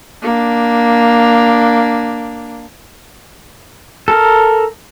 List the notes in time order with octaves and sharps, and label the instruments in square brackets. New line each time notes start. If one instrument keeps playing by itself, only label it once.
[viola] A#3 D4
[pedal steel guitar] A4 A#4